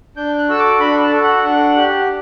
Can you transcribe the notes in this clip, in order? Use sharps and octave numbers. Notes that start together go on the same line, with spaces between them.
D4 G6
F#6
F#4 A4 E6
D6
D4 B5
A5
F#4 A4
F#5
D4
G4